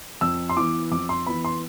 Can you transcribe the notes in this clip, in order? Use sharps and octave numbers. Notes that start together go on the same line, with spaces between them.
F2 E6
C6
E3 B3 D6
F2 D6
C6
E3 B3 B5
C6